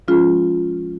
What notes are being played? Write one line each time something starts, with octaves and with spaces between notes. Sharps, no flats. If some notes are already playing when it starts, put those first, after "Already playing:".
F3 G#3 C#4 F4 G#4